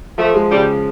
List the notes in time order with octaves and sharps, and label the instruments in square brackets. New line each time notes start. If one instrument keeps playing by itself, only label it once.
[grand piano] F3 [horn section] A3
[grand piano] G#3
[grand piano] C#3 [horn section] G3